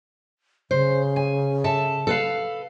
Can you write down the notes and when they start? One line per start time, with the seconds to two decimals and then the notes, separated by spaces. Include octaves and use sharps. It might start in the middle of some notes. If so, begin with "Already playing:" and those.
0.71 C#3 C5
1.16 G#5
1.64 A4 E5 A5
2.07 A4 B4 F5